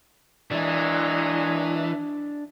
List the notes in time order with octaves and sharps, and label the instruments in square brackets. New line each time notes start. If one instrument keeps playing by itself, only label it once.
[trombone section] A#2 F#3 G#3 [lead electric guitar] E3 [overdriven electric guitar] D4